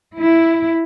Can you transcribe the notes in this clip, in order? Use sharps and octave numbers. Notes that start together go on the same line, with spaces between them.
E4